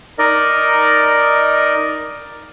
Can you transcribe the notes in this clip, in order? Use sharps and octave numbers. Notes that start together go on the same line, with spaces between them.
D#4 A#4 D5 D#5